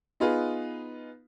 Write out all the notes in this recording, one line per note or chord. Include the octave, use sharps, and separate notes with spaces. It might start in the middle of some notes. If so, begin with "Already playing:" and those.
B3 D#4 F4 G#4 B4